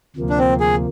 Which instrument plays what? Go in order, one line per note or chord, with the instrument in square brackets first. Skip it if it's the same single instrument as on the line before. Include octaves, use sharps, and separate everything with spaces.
[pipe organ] D2 C3 F3 A#3
[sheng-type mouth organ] D4
C4
G#4